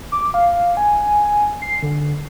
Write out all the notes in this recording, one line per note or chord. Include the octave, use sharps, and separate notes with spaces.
D6
F5
G#5
C7
D3